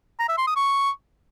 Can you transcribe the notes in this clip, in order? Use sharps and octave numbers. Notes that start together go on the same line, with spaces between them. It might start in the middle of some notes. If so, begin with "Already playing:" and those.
A#5
E5
C6
D#6
C#6